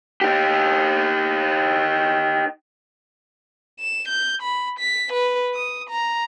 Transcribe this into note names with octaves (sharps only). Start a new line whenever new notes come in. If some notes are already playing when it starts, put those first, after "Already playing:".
D#4 G4
E7
G6
B5
B6
B4
D#6
A#5